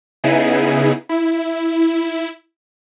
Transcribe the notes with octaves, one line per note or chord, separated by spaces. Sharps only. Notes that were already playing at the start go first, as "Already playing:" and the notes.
C#3 B3 D#4 E4 G#4
E4